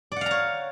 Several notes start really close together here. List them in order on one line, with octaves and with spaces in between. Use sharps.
D5 F#5 F5 A#5 C#5